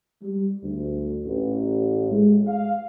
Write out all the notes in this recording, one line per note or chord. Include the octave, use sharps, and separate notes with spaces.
G3
D2
A1
G#3
F5